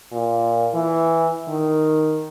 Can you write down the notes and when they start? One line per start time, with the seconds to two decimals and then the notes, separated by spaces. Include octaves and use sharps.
0.13 A#2
0.74 E3
1.48 D#3